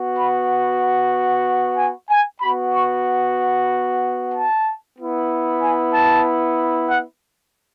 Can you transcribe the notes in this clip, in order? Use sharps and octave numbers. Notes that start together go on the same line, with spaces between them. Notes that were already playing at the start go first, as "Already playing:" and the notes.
Already playing: B3 F#4
B5
G#5
G#5
B3 F#4 B5
C#6
A5
B3 E4
G#5
A5
F#5